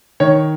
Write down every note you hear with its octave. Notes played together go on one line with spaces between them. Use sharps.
D#3 C#5